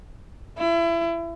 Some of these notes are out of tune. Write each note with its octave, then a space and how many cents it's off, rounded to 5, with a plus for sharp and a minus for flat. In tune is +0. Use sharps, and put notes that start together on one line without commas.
E4 +30